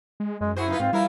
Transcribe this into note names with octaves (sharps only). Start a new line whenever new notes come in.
G#3
F#2 G#3
E4 F#4 G#4 C5
D#4 F4 B4
G#2 C4 F4
F3 G3 E4 A#4